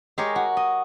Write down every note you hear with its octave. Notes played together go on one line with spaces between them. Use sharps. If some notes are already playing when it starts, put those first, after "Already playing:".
G#3 G4 A#4 C#5
F#4
D#5